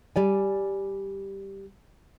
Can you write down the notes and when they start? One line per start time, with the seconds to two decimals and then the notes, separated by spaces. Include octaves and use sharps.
0.16 G3 D5 G#5